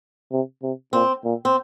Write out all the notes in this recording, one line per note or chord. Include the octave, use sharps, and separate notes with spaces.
C3
C3
A#2 C4
A#2
C4